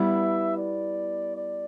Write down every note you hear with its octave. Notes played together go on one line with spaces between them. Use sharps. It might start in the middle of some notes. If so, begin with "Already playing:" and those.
Already playing: G3 B3 E4 E5
D5
D5